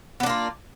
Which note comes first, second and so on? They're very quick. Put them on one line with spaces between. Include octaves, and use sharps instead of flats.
B3 D4 A#3 F4